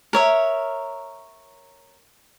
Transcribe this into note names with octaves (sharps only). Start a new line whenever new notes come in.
A#4 C#5 E5